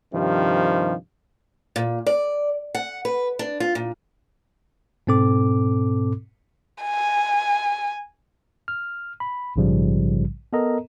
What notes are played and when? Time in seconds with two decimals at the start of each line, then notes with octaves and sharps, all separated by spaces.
0.12 G2 C3 D#3 F3
1.76 A#2
2.07 D5
2.75 F#5
3.05 B4
3.39 D4
3.60 F4
3.75 A#2
5.07 G#2 B2 C4 A4 D6
6.83 G#5
8.68 F6
9.20 B5
9.56 A#1 G#2 C#3 F3 G3
10.53 B3 A4 A#4 D#5 A#5